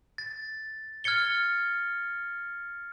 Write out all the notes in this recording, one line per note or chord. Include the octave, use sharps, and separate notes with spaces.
A6
F6 G#6 A6 C#7 G7